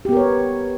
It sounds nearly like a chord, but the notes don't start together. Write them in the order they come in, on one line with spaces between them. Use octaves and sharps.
G4 B3 A#4 C#5